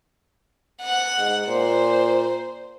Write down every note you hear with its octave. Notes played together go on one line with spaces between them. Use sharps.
F#5
G#2
A#2 C5